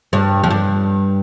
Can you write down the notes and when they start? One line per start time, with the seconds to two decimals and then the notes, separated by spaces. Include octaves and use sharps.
0.13 G2
0.44 F2
0.50 G2